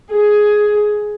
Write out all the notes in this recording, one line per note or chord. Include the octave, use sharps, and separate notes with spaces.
G#4